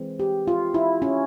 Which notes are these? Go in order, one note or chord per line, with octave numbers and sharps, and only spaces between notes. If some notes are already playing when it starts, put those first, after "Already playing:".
Already playing: E3 G#3 C4
G4
F4
E4
C#4